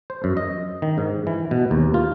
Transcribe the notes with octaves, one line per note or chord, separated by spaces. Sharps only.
C5
F#2
D#5
D#3
G#2
E3
B2
D#2
F4